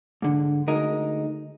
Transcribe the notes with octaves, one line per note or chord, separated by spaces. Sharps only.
G#2 D3
D2 G#3 D#4 A#4